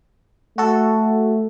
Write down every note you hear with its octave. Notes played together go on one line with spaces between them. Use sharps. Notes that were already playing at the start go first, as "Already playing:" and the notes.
A3 F#4 A4